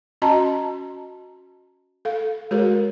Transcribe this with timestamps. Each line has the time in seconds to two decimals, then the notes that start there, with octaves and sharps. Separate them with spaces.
0.22 C#4 F#4 D#5 A5 A#5 C6
2.05 A4 F5
2.51 G#3 F#4 G#4 A#4 C#5